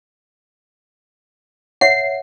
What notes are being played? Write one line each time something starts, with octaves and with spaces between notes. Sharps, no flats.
C#5 E5 F#5 C7